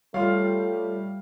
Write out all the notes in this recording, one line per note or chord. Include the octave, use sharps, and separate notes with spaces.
G3 A3 F4 C#5 F5 F6